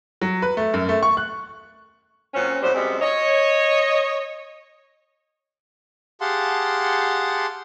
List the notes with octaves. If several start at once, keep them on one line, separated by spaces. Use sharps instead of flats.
F#3
B4
A3
F#2
A3
C#6
F#6
A#2 F#3 C4 C#4
A2 F#3 G3 B3 C5
F#2 G3 G#3 B3 C4 G4
C#5 D#5
G4 G#4 F5 F#5 A5 C6